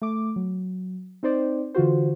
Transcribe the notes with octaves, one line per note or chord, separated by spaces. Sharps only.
A3 D6
F#3
C4 D#4 C5 D5
D3 E3 F4 F#4 C5